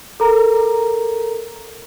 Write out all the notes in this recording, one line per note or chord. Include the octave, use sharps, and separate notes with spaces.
A4 A#4 A#5